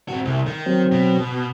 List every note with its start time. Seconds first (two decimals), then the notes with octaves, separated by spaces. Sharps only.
0.08 C4 F#4
0.25 C2
0.47 D#3
0.66 F#3 C4
0.92 B2